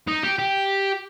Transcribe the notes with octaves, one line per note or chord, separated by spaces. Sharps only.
D#4
G4
G4